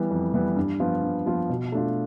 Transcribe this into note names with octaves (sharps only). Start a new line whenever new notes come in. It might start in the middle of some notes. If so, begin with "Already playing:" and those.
Already playing: E3 G3 B3
F2
E3 G3 B3
G2
F3 B3 F4
G2
F3 B3 F4
B2
A3 D4 F4